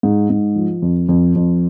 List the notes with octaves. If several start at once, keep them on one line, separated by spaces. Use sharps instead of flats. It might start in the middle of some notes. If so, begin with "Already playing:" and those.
G#2
G#2
F3
F2
F2
F2